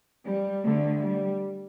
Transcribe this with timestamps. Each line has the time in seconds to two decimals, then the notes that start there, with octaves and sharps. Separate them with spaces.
0.25 G3
0.64 D2 D3 A3
1.02 G3